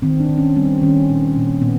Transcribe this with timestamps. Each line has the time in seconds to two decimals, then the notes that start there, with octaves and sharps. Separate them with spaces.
0.02 D#3 C4
0.20 D4
0.29 D#3
0.38 C#4
0.56 G3 C4
0.82 D#3 C#4
1.09 A#2
1.36 A#2
1.62 A#2 B3